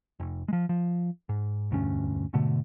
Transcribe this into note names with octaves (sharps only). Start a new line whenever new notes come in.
F1
F3 G#3
F3
G#2
E1 D2 G2 C#4
G#2 B2 D3 A3